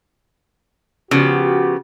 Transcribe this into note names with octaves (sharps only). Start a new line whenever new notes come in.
C#3 F3 B3 F#4 G4